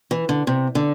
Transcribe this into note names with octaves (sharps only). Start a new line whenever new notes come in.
E3
D3
C3
D3